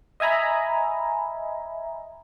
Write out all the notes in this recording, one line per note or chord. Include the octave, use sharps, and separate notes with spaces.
D#5 E5 G#5 A#5 B5